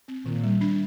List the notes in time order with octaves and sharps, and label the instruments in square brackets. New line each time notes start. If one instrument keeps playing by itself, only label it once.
[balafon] C4
[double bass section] A#2 [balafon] D#3
[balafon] G3
D4